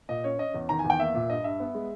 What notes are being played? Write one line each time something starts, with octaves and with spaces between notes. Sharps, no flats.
A#2 D#5
C#4 C#5
C#4 D#5
E2
D#3 A#5
G#5
E2
G5
A#3 E5
A#2
G2 D#5
G2 E5
B3
G#3